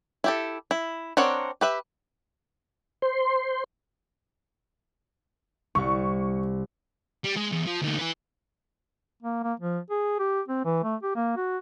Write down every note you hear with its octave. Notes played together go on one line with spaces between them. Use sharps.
E4 G4 A4
E4
C4 D4 A#4 C#5 F#5
G4 B4 E5
C5 C6
C2 C#6
G3
G#3
E2
F3
D2 D#4
E4 B4
A#3
A#3
F3
G#4
G4
C4
E3
A3
G4
A#3
F#4